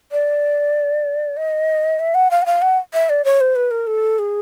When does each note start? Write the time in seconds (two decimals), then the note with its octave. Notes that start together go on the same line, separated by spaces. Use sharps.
0.12 D5
1.37 D#5
1.99 E5
2.14 F#5
2.31 F5
2.42 F#5
2.46 F5
2.62 F#5
2.93 E5
3.09 D5
3.24 C#5
3.41 C5
3.56 B4
3.71 A#4
3.87 A4
4.19 G#4